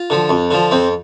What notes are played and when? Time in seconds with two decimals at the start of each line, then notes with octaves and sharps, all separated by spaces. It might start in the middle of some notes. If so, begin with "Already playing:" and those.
Already playing: F4
0.10 D3 F3
0.29 F2
0.51 D3 F3
0.71 F2 C4